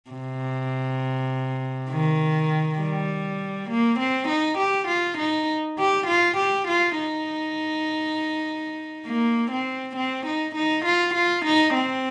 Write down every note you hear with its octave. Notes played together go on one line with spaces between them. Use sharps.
C3
D#3
G3
A#3
C4
D#4
G4
F4
D#4
G4
F4
G4
F4
D#4
A#3
C4
C4
D#4
D#4
F4
F4
D#4
C4